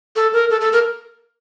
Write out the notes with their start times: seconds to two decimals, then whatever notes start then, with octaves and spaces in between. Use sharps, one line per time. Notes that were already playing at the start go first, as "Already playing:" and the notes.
0.16 A4
0.33 A#4
0.50 A4
0.61 A4
0.73 A#4